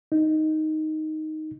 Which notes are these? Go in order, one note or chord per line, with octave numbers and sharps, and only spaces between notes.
D#4